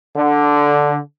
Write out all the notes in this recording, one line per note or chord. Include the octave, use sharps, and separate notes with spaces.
D3